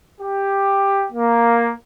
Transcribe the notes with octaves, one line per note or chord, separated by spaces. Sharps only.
G4
A#3